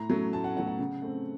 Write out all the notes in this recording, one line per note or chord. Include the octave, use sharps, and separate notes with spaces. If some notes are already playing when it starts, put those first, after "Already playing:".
Already playing: A2 A#5
F#3 A3 C#4
A2 A5
F#5
F#3 A3 C#4 F#5
F#5
C#3
A3 C4